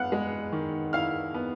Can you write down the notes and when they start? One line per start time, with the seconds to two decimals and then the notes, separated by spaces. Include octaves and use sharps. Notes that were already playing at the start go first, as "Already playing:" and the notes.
Already playing: B3 E4 F5 F#5 F#6
0.12 G#3
0.52 D#3
0.93 E4 F5 F6
1.34 B3